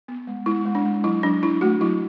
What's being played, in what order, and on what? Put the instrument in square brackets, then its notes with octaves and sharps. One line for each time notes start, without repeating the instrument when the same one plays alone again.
[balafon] B3
G#3
G#3 E4
G#3
D4
G#3
F#3 E4
F#3 D4
D4 E4
A3 F#4
F#3 E4